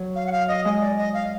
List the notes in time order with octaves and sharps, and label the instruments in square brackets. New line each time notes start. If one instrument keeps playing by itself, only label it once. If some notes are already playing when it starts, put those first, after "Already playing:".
Already playing: [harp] F#3
[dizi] F5
F#5
F5
D#5
[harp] G#3 [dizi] D#5
[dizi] D5
D#5
F5